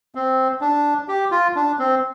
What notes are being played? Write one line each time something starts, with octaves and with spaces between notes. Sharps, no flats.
C4
D4
G4
F4
D4
C4